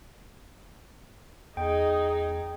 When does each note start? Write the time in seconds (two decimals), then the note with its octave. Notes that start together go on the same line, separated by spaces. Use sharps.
1.57 E2 D#4 G#4 G5